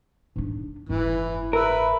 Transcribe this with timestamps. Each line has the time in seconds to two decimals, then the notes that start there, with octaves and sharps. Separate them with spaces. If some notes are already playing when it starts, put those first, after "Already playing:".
0.36 G#2 D4
0.89 F#1 G#2 E3
1.53 A#4 B4 E5